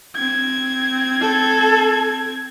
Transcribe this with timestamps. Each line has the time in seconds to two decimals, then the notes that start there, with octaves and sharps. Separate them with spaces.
0.16 C4 G#6
1.21 A4